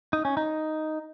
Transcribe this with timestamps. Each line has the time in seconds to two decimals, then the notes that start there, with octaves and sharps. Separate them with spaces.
0.13 D#4
0.25 C#4
0.37 D#4